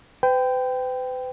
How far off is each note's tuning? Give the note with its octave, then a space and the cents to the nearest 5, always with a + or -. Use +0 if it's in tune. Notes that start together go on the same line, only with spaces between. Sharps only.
B4 +45 G5 +0